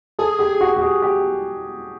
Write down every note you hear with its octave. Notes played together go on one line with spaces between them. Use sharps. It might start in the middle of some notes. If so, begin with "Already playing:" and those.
G#4 A4
G4
F#4
G4
G#4
G4